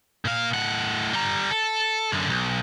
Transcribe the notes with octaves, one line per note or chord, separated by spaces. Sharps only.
A#2 F5
A2 F#5
G3 A#5
A4
F#2 D3
B1